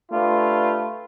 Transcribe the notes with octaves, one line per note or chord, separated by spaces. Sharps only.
A3 D4 F4 G4 B4